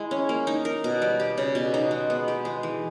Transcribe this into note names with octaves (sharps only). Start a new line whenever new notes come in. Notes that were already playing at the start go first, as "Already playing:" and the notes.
Already playing: G#3 E4
C#4
A#3
D#4
A#4
B2
G3
G4
C#3
B2
D#4
G#3
B3
G4
G#3
E3